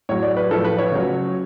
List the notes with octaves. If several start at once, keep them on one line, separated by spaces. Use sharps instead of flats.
A2 F#3 C#5
D5
B4
A2 F3 A4
B4
C#5
C#3 F#3